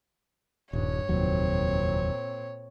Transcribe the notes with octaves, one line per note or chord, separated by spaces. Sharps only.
D#1 G2 C#5
F1 D#2 A#2 F#3 C4